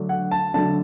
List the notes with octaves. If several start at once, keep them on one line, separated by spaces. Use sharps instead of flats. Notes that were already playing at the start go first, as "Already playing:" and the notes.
Already playing: D3 F#3 A3 D4
F#5
A5
D3 F#3 A3 D4 A5